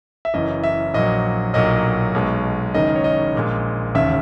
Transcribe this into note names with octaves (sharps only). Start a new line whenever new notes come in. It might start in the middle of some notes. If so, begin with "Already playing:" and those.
E5
F#1 F#2 E3 D#5
E5
A#1 A#2 F#3 D#5
B1 A#2 F#3 D#5
B1 B2 G#3
F#1 F#2 D#3 G#3 D#5
C#5
D#5
A#1 A#2 G#3
E1 D#2 C#3 E5